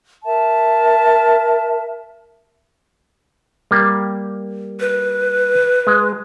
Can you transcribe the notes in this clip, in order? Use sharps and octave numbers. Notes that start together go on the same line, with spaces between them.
A#4 E5 A5
G3 A#3
B4
G#3